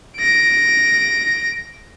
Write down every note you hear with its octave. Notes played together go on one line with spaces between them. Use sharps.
A#6 D7